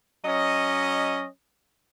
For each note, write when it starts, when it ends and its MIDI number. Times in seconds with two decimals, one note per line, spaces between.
0.25 1.27 54
0.25 1.27 61
0.25 1.27 75